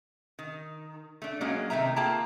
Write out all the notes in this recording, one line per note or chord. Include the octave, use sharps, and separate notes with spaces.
D#3
A3 D4
F#3 G#3 A#3 C#4
C3 D#3 A3 E5 A#5
A#3 F4 G#4 G5 A5 A#5